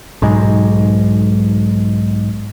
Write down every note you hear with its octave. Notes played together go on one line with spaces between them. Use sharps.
B1 G#2 G#3